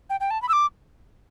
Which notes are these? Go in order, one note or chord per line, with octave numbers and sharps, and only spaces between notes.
G5
G5
A5
B5
E6
D6